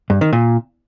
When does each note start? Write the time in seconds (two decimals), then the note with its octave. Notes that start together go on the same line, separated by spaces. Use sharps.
0.10 G2
0.21 D#3
0.33 A#2